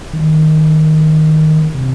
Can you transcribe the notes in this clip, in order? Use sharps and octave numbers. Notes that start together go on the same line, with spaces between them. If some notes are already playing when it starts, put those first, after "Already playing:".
D#3
C3